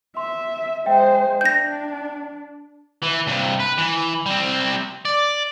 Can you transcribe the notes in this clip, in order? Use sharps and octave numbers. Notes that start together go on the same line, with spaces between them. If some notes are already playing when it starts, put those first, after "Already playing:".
E5 C6
G#3 C5 E5 G5
D4 G6 A#6
E3
G2 C3
B4
E3
G3 C4
D5